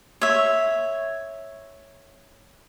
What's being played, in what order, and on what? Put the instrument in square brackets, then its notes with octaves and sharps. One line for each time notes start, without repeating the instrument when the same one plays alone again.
[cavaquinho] C#5 E5